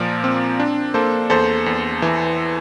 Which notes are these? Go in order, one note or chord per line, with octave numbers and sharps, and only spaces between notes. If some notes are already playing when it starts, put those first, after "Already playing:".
Already playing: A#2 F3 A#4 D5
C4
D4
A#3 A4 C5
E2 A4 C5
E2
E3